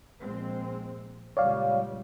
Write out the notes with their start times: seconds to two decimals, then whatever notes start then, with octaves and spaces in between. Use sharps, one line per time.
0.21 A#1 G#3 C4
1.37 C#2 A#2 G3 C#5 D5 F5